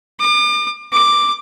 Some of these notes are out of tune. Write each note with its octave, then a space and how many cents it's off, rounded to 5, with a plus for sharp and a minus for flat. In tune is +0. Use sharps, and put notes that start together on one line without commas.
D6 +40
D6 +5